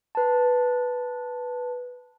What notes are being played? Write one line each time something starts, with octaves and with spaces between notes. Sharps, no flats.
B4 A5